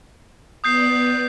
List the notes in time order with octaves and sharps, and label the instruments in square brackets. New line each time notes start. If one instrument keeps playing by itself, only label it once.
[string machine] B3 B4 D5 [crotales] D#6 G6 C7